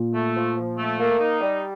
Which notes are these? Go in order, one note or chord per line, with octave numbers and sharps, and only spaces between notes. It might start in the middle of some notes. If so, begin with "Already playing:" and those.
Already playing: A#2
A3
F3
F3
A3
A#3
D#4
G3